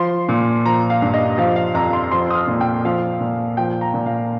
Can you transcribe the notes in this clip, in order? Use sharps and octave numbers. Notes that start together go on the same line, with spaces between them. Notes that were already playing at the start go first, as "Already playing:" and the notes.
Already playing: F3 C6
A#2
F3 A#5
F5
G2
D#5
F3 F5
F5
F2 A#5
C6
F3 C6
D#6
F6
A#2
G5
F3 F5
A#2
F3 G5
A#5
A#2
F5